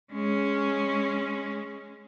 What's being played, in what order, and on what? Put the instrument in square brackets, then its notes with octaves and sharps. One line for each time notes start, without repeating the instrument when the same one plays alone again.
[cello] G#3 C#4